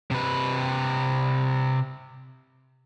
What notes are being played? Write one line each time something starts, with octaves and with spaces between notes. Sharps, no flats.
C3 B4